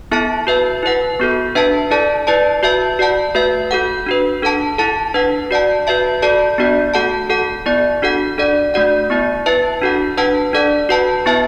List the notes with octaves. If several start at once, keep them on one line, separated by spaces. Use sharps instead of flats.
B3 E4 A4 E5 A5
F#4 B4 E5
E4 B4 F#5
B3 F#4 A4
D4 B4 E5 A5
E4 A4 D5 A5
E4 B4 D5 A5
F#4 B4 E5 A5
F#4 D5 F#5 A5
A3 F#4 B4 E5
F#4 A4 F#5
D4 F#4 B4
D4 A4 F#5 A5
E4 A4 F#5 A5
D4 B4 F#5
F#4 D5 F#5 A5
F#4 B4 E5 A5
F#4 A4 D5 A5
B3 D4 F#4 D5
A3 F#4 A4 F#5 A5
F#4 A4 F#5
B3 E4 D5
D4 F#4 A4 F#5
D4 A4 D5 F#5
A3 D4 F#4 D5 F#5
B3 E4 D5
E4 B4 E5 A5
D4 F#4 A4 F#5
D4 B4 F#5 A5
D4 A4 D5 F#5
F#4 B4 F#5 A5
B3 E4 B4 E5 A5